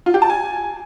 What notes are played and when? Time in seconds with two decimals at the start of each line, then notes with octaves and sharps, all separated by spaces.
0.06 F4
0.14 G4
0.22 A5
0.30 G#5